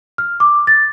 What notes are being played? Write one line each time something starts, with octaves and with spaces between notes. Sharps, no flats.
F6
D6
A6